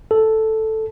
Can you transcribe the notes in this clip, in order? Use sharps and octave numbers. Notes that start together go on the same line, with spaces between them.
A4